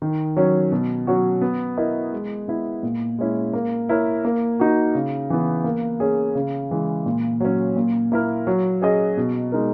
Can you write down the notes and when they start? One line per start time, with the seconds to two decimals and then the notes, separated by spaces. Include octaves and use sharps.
0.02 D#3
0.37 F#3 C#4
0.71 B2
1.07 F#3 C#4 F#4
1.41 B3
1.78 E4 A#4 D#5
2.13 G#3
2.48 B3 E4
2.83 A#2
3.19 G#3 C#4 E4
3.53 A#3
3.89 E4 A#4 C#5
4.25 A#3
4.60 D#4 F#4
4.95 C#3
5.30 E3 B3
5.64 A#3
6.00 C#4 G#4
6.35 C#3
6.71 E3 G#3
7.06 A#2
7.40 F#3 C#4
7.76 A#2
8.12 A#3 E4 A#4
8.47 F#3
8.82 C#4 G#4 D#5
9.17 B2
9.52 G#3 D#4 A#4